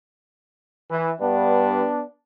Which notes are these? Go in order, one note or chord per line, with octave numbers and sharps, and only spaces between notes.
E3
G2 B3 D4